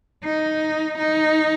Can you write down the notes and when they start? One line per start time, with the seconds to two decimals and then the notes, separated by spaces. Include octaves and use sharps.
0.25 D#4
0.98 D#4